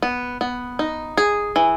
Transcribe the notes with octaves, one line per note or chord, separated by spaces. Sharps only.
B3
B3
D#4
G#4
E3